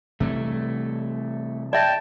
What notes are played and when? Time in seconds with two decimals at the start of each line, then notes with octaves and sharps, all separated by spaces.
0.20 C3 E3 G3 A3
1.73 D5 E5 G5 A5